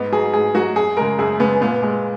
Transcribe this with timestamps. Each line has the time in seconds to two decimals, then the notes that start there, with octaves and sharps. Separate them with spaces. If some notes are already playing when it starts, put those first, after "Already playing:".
Already playing: G#2 B3
0.12 F#3 G#4
0.34 G#2 G#4
0.55 F#3 F#4
0.76 F#2 G#4
0.97 C#3 G#3 A#4
1.19 F#2 G#4
1.40 C#3 G#3 B3
1.61 A#2 B3
1.83 G#3